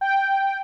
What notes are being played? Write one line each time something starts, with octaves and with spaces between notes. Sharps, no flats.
G5